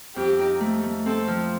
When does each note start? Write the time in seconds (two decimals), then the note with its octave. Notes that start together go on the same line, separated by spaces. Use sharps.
0.16 F2 G4
0.39 D#4
0.60 A3
0.83 A3
1.06 C4 A4
1.27 F3